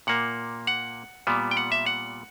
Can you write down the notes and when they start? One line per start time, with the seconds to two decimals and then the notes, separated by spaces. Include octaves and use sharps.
0.07 A#2 A#3 F#5
0.67 F#5
1.27 A#2 G3 B3
1.51 G5
1.57 F#5
1.72 E5
1.86 F#5